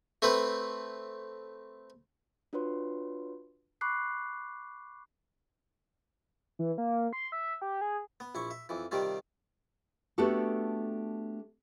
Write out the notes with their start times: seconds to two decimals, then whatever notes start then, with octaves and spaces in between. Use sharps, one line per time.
0.22 A3 C4 B4
2.53 D4 F4 F#4 B4 C#5 C6
3.81 B5 C#6 D6 F#6 C7
6.59 E3
6.78 A#3
7.13 C6
7.32 E5
7.62 G4
7.81 G#4
8.20 B3
8.35 A#1 E4 C#6
8.51 E5
8.69 F2 E3
8.91 C3 D#3 G3 C4 F4
10.18 A3 B3 D4 F#4 G4 A4